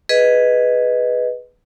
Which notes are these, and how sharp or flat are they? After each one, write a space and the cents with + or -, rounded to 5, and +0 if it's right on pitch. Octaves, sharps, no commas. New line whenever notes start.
G#4 +5 B4 +0 D#5 +0